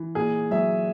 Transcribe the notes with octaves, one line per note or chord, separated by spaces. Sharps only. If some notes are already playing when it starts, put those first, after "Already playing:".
Already playing: E3
A#2 G#4
F#3 E5